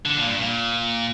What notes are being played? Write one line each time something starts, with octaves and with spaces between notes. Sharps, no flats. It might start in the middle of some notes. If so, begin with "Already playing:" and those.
D3
A#2
G2
A#2